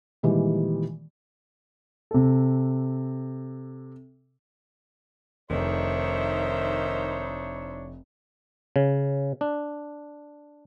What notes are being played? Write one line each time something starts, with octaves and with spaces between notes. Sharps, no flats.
A#2 D#3 E3 G3 G#3
C3 A4
F1 D#3 D4 D#4 C5 C#5 E5
C#3
D4